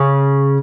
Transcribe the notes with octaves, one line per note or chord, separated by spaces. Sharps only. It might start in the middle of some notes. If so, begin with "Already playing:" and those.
Already playing: C#3